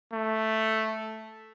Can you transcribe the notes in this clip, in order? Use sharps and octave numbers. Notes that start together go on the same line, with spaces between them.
A3